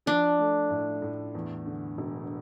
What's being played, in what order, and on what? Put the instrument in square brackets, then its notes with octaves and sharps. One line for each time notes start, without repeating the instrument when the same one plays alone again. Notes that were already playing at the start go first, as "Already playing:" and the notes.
[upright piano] F3 [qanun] D4
[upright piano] A3
A2
A2
E2
D3
E1